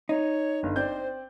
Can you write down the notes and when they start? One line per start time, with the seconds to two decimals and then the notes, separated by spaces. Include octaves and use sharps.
0.09 D#4 C#5
0.63 G1
0.76 C4 C5 D5 G6